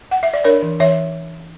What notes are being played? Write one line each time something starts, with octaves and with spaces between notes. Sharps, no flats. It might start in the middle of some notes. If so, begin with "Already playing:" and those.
F#5
E5
D5
D4 A#4 C#5
E3
E3 C#5 E5